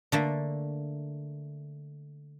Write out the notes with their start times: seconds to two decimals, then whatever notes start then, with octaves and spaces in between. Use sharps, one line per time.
0.12 D3 A3 A#3